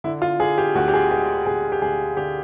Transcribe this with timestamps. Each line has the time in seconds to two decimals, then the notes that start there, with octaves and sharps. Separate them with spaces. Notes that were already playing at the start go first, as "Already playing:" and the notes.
0.04 D3 E4
0.22 F4
0.40 D3 G#4
0.58 G4
0.75 D2 F#4
0.88 G4
0.93 G#4
1.11 G#3 G4
1.46 D2 G#4
1.72 G4
1.82 D2 G#4
2.17 D3 G4